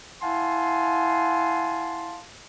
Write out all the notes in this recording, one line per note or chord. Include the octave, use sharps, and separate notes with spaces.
E4 F5 F#5 G#5 A5 C6